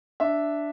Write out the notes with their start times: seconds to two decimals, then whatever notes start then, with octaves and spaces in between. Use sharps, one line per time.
0.20 D4 E5